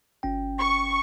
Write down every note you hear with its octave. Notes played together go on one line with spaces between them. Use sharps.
G1 C#4 G5
C#6